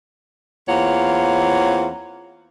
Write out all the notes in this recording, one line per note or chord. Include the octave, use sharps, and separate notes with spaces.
E2 A#3 C4 F4 C#5 F#5